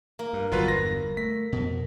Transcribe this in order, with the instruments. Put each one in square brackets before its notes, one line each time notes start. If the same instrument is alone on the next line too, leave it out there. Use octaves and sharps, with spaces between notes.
[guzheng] A#3
[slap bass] G2
[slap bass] G1 E2 [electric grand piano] F#3 F4 B4
[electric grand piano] A#6
[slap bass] A3 [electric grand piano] B6
[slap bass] F2 B2